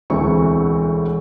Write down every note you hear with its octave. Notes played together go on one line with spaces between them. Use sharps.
E1 D2 E3 C4 C#6